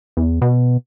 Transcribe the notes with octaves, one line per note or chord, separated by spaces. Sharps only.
E2
B2